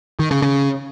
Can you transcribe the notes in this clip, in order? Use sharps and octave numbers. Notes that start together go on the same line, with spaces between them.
D#3
C#3
C#3